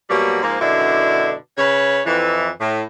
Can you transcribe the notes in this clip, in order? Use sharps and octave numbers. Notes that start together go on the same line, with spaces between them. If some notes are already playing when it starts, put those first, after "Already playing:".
B2 F#3 G3 A#3
G#2 F3 A#3
F#2 B2 D3 D4 E4
C#3 B4 C#5
F2 E3
A2